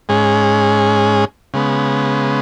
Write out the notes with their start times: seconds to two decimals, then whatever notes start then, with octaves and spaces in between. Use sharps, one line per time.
0.09 G#2 G#3 C#4 G#4
1.54 C#3 G#3 B3